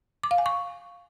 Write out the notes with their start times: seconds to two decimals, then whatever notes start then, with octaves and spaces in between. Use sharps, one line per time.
0.23 D6
0.31 F5
0.38 G#5
0.46 C#6